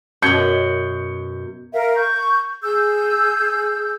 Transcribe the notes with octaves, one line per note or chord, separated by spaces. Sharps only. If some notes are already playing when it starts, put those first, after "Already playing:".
F#2 B2 G6 G#6 C#7
A#4 E5 F5
C#6 G6
G#4 E6 G6